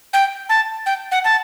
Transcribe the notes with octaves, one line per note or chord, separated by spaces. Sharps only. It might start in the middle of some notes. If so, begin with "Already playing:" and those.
G5
A5
G5
F#5
A5